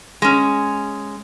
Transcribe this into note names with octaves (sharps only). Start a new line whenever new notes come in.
G#3 C#4